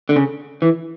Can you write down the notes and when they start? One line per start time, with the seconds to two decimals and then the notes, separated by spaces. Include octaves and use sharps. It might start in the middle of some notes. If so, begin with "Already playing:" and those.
0.09 D3
0.16 C#3
0.62 E3